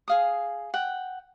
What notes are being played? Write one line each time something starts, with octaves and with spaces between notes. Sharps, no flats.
G#4 F5 D#6
F#5 G5